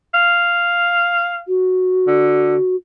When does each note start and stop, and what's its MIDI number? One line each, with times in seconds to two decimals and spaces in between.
0.14 1.41 77
1.48 2.76 66
2.07 2.56 50